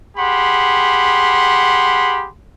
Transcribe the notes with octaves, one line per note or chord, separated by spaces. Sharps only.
G4 G#4 F#5 B5 C6